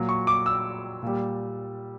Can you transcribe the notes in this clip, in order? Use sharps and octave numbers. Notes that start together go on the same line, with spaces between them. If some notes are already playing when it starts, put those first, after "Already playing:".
Already playing: A#2 F#3
C#6
D6
E6
A#2 G3